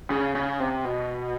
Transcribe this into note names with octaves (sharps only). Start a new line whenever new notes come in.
C#3
C#3
C3
B2